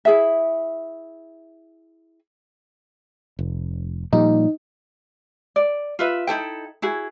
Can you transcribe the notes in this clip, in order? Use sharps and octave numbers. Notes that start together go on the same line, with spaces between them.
E4 G#4 E5
F1
A#2 F3 G3 D#4
D5
F4 B4 E5
D#4 E4 A4 G5
E4 F#4 G#4